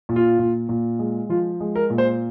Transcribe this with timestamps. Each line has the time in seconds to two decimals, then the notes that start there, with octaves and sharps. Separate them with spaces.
0.09 A#2
0.16 F4
0.39 A#2
0.69 A#2
0.99 G#3
1.29 F3 F4
1.60 G#3
1.75 A#4
1.90 A#2
1.98 C5